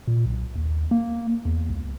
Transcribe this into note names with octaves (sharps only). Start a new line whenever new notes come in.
A#2
B1
D#2
A#3
E2
C#2